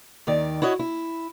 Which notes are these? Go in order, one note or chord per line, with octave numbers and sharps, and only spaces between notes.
D#2 D#3 D5
E4 F#4 C#5 D#5
E4